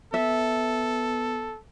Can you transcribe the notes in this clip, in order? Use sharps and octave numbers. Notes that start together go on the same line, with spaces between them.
B3 A4 E5